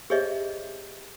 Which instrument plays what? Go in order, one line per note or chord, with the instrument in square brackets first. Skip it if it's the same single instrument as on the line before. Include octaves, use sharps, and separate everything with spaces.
[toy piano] G4 G#4 C5 C#5 D#5 E5